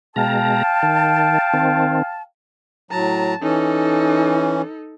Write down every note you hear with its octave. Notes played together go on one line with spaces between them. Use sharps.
B2 G#3 F5 G5 A5 A#5
D#3
D#3 C4
A2 F#3 A5 A#5
E3 C#4 D#4 A4